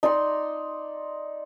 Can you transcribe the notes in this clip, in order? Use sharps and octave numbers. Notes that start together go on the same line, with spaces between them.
D#4 D5 D#5 C6